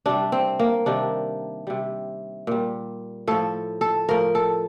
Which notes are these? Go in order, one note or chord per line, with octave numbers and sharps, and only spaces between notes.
C3 G3 D4
C4
A#3
C3 D#3 G3 D4
C3 G3
A#2 G3
A2 F3 A4
A4
A2 F3 A#4
A4